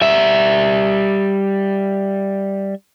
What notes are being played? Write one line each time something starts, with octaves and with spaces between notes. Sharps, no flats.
G3 E5